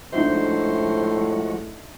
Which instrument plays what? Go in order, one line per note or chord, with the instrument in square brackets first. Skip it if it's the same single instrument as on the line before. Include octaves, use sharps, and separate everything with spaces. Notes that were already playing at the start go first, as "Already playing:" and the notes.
[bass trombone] A2 [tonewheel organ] F3 G#3 F#4 [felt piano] D4 D#4 E5 [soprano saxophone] C5